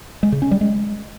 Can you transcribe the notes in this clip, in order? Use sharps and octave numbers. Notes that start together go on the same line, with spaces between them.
G#3
C#3
C#4
G3
G#3